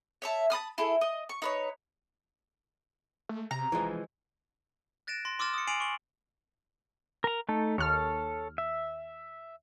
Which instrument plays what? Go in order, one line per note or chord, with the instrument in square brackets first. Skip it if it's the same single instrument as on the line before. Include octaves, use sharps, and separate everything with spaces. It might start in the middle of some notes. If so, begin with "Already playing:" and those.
[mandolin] C#5 E5 A5
A5 B5 D#6 F6
E4 G#4 A4
D#5
C#6
D#4 B4 C#5
[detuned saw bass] A3
[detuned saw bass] C3 [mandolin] A#5
[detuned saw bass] F1 [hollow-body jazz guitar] E3 F3 G#3
[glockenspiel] F#6 A6 A#6 D7 E7
C6 A#6
C6 D6 E6 F6 A6 E7
D#6 C#7
G#5 C7 D7 F7 F#7
C#6 F#7
[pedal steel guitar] A#4 A#5
A3 D#4 A4
[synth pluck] D#2 F6 [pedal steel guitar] A4 C#5
[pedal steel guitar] E5